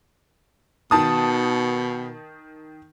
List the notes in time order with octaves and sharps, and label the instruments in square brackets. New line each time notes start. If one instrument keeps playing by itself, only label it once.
[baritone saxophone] B2 [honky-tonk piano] D#3 A5 D#6